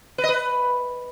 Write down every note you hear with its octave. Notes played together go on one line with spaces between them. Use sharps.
B4
D#5
B4